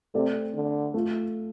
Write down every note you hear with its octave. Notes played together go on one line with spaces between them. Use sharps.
C3 A3 C4 A4 D5
D3
A3 F4 A4